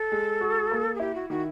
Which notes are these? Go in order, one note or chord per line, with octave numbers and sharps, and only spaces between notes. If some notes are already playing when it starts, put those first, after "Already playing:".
Already playing: A4
G#3
F#4
A#3
G#4
E4 G4
F#4
D#3 F#4